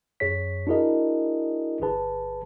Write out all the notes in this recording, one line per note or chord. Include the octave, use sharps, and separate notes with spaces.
F#2 G#4 C#5 B6
D4 E4 F#4 G#4 A#4 D#5
G1 G#4 B4 A5